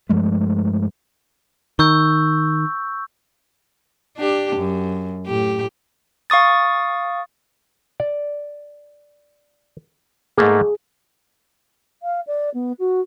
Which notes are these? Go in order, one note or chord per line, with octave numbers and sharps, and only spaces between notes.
G2 F3 G#3 A3
D#3 C#6 E6 G6
D4 G4
F#2
A2 G4
F5 C#6 D#6 A6
D5
G#2 A3 A#3 G#4
F5
D5
B3
F#4